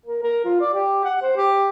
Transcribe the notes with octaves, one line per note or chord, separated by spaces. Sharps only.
A#4
A#4
F4
D5
G4
F#5
C5
G4